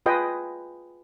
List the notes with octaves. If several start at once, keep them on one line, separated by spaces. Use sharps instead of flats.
F4 G#4 B4 D#5 G5